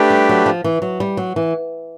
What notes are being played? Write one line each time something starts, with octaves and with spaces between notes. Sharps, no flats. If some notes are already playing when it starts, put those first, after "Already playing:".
Already playing: A3 D4 G4 B4
G3
F#3
F3
E3
F#3
G3
F#3
E3